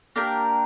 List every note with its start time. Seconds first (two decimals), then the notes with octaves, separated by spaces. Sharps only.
0.16 A#3 D4 G4 A#4